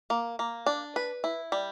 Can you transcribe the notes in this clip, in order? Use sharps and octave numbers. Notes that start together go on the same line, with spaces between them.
A#3
A#3
D4
B4
E4
G3